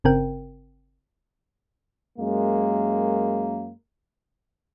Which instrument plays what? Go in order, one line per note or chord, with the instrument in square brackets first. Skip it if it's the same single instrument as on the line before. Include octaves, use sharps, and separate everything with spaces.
[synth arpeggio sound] G1 C#3 C4 A#4 G5
[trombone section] F#2 G#3 A#3